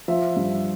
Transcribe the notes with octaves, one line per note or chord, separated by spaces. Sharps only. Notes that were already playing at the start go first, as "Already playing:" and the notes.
F3 E5
G2